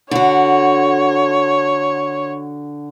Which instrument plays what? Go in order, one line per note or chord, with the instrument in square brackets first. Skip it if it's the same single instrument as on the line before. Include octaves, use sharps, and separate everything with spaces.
[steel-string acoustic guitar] D3 F#4 [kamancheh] C#5